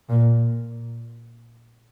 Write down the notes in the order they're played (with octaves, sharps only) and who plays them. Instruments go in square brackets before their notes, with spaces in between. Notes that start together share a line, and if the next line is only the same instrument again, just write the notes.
[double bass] A#2